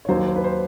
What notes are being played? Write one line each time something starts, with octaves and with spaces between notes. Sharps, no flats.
C#5
D#2 D#3 F#3 C5
C5
B4
C5